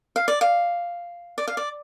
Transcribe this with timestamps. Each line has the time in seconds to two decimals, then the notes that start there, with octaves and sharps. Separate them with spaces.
0.16 F5
0.28 D5
0.41 F5
1.38 D5
1.48 F5
1.57 D5